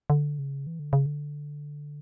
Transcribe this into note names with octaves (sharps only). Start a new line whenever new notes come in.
D3
C#3
E3
D3
C#3
D3